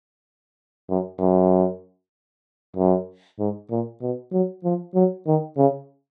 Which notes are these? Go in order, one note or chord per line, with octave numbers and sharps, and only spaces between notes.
F#2
F#2
F#2
G#2
A#2
B2
F#3
F3
F#3
D#3
C#3